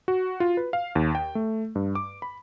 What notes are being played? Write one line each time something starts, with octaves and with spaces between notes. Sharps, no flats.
F#4
F4
B4
F5
D#2
G5
A3
G2
D6
B5